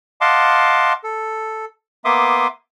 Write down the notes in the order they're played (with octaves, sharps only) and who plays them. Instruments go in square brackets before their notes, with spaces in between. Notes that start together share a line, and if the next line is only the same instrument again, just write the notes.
[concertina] D#5 F5 F#5 A5 C6 D6
A4
A#3 B3 E5 C6 D6 D#6